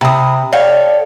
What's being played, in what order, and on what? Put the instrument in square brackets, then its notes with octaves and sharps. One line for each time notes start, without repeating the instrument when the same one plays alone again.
[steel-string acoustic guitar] C3 [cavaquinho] B5 D#6
[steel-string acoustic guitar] A4 [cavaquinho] C#5 F5 G5 [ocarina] D5